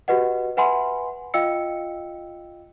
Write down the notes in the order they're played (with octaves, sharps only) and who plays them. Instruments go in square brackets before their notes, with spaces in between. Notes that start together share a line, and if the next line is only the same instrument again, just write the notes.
[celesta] F#4 G4 B4 D#5 F#5
B4 E5 F#5 G#5 B5 C6
F4 D#5 F5 G5 E6 C#7